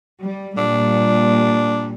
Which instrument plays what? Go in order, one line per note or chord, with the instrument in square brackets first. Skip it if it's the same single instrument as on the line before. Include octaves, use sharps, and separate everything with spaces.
[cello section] G3
[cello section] A#2 G3 [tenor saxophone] D4